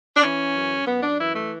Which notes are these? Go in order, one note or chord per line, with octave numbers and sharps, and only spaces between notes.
D4
E3 C#4
F#2
F#2 B3
D4
E3 E4
A3